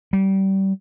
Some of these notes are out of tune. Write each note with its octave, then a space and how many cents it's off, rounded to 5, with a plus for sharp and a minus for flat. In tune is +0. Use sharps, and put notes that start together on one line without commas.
G3 -25